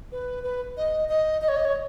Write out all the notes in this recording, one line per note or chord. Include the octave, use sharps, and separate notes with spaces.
B4
B4
D#5
D#5
D#5
C#5
D#5
C#5